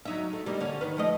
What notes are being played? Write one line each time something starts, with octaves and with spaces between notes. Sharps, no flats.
F#3 D#4 E5
A3
G3 A#3 D#4
D3 C#4
D#3 B4
F3 A3 D#5